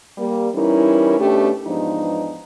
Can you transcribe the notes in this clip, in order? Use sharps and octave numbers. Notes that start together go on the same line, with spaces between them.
G3 A#3
E3 G3 C#4 D#4 E4 A#4
B2 A3 C#4 D4 G4
E2 G#2 F3 B3 D4 D#4